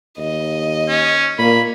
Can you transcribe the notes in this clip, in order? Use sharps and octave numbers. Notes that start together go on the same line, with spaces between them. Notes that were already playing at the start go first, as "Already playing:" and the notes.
D#2 D#5
C#4
A#2 A#3 B5